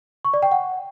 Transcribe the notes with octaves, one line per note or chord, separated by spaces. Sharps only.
C#6
D5
G5
F#5